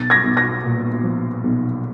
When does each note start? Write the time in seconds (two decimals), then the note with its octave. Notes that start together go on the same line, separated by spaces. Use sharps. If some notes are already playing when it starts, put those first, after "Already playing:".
Already playing: B1 A6
0.10 G#6 A#6
0.24 B1
0.37 G#6 A#6
0.64 A#2
1.03 F3
1.44 B1